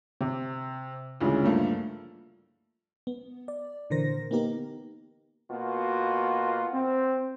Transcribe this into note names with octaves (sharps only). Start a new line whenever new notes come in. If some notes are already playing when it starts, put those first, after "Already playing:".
C3
D2 A#2 C#3 E3 G#3
G2 F3 A3 A#3
B3
D5
A#2 D3 E3 A#4 C5 A#6
A#3 B3 D#4 G4 A#4
B2 A#3 F4 F#4
C4